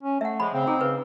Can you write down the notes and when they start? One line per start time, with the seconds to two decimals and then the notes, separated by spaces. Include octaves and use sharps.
0.03 C#4
0.21 A3 E5 F#5
0.40 C#3 F3 G#3 B5
0.53 C#3 C4
0.67 D#4 G#4
0.81 C#3 B4